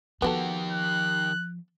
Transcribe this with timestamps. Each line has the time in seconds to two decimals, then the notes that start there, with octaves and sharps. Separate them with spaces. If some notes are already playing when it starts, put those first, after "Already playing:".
0.22 D#3 F3 B3 F#4 G4 A4
0.71 F#6